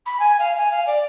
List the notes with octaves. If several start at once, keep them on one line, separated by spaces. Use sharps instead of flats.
B5
G#5
F5
G#5
F5
D5